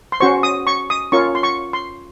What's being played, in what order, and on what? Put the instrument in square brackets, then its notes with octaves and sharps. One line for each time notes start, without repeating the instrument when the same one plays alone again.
[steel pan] C6
C#4 F#4 C5 C#6
D#6
C#6
D#6
C#4 F4 A#4 C#5 C#6
C6
C#6
C6